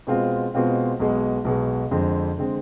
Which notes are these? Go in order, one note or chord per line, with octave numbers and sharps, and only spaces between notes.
B2 G#3 C4 F4
B2 G#3 C4 F4
B1 B2 G#3
B1 B2 G#3
F2 D3 G#3 C4
D3 G#3 C4